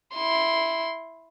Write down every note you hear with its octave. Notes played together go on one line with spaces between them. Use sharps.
E4 C6